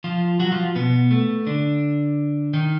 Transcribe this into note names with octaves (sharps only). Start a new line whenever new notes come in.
F3 F4
F#3 F#4
F3 F4
B2 B3
A3
D3 D4
D#3 D#4